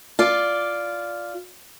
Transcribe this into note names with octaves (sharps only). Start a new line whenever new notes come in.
F4 D5